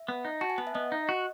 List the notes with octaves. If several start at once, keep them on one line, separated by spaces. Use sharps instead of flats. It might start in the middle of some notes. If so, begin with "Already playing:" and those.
Already playing: E5
B3
D#4
F#4 A5
G#5
B3 F#5
E5
B3 D#5
D#4
F#4